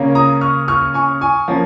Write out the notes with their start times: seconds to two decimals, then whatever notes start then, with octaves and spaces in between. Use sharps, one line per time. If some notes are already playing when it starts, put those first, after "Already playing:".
Already playing: C#3 A#3 C#4
0.15 A#5 D#6
0.41 C#6 F6
0.68 C#6 F6
0.94 G#5 C#6
1.21 G#5 C#6
1.48 F3 A#3 C#4